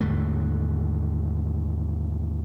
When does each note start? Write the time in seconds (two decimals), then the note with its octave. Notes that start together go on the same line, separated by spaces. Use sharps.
0.01 D#2 G#2 D3 A3